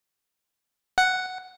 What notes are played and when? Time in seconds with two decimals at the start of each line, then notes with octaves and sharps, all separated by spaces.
0.98 F#5